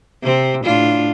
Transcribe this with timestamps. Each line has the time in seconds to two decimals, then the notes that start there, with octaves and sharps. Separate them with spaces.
0.22 C3 C4
0.64 A2 D4 F4